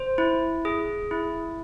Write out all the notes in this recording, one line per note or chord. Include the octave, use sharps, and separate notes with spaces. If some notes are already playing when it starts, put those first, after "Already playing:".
Already playing: C5
E4
G#4
E4